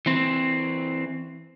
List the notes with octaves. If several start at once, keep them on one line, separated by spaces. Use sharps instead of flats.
E3 C4